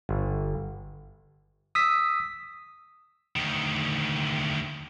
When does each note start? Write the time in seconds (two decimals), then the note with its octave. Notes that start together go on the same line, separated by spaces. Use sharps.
0.09 G1
1.75 D#6 E6 B6
3.36 D2 D#3